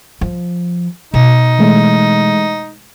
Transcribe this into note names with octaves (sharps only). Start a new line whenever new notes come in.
F3
B2 D#4
E3 G#3 A3